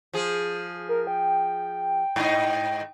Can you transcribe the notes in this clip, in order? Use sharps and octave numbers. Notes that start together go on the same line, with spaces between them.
F3 G#4
A#4
G5
G#2 D#4